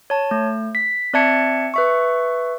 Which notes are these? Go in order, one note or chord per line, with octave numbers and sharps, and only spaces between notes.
C#5 A5
A3
B6
C4 D5 E5 A5 G#6 C#7
B4 E5 C#6